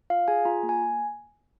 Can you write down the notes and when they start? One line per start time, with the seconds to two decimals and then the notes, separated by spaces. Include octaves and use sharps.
0.10 F4 F5
0.28 G#4 G#5
0.45 F4 A#5
0.63 A#3
0.69 G#5